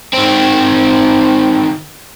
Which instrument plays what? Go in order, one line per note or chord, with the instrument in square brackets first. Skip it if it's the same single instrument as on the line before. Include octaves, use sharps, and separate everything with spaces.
[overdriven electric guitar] D#3 C4